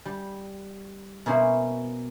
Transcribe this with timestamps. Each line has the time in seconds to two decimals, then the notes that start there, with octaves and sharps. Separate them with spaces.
0.05 G3
1.26 B2 A#3 C#4 E4 C5